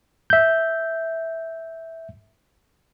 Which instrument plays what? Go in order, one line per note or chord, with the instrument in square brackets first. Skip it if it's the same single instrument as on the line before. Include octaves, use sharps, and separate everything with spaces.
[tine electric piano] E5 G6